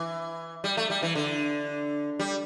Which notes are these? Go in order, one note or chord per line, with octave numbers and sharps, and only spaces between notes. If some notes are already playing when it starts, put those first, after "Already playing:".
Already playing: E3
G3
A3
G3
E3
D3
G3